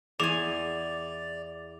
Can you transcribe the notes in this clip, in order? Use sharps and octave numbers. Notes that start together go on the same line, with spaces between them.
E2 G#4 D5 G#5 D6 F7